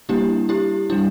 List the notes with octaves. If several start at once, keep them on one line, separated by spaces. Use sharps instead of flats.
G3 A#3 D4 E4 G4
E4 G4
G3 D4 E4